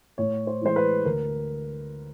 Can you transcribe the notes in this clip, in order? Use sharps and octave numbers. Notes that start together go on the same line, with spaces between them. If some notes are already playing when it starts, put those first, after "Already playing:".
A2 C#5
C5
E3 G#3 C5
B4
D2 A#4